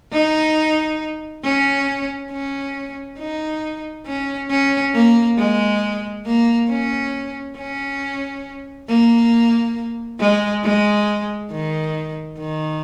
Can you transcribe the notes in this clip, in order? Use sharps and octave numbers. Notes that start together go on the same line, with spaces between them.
D#4
C#4
C#4
D#4
C#4
C#4
A#3
G#3
A#3
C#4
C#4
A#3
G#3
G#3
D#3
D#3